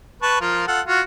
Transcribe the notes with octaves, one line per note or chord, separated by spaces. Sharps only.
B4 A5 C#6
F3 F4 A#4
F4 A4 F#5
F4 F#4